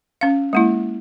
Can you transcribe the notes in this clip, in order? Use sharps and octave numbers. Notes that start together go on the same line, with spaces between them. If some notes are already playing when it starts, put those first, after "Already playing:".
C#4 F5
G#3 A#3 E4